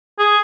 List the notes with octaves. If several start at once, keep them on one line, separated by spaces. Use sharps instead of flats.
G#4